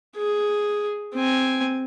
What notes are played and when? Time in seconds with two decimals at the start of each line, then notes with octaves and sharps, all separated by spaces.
0.17 G#4
1.15 C4 G#5